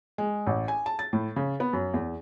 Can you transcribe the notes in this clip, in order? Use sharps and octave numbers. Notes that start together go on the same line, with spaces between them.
G#3
A1
G#5
A5
A6
A2
C#3
B3
F#2
E2